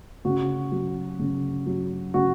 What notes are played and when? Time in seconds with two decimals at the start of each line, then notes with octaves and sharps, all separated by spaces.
0.25 C#3 F#4
0.72 F#3
1.19 C#3
1.67 F#3
2.14 C#3 F#4